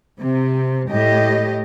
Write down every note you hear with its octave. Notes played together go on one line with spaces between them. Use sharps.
C3
A2 G4 D#5